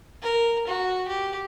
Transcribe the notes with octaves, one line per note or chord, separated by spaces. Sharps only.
A#4
F#4
G4